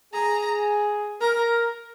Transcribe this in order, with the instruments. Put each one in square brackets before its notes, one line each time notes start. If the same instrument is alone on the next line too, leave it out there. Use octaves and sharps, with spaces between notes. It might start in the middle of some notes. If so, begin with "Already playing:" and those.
[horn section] G#4 [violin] A#5
[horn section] A#4 [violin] A#5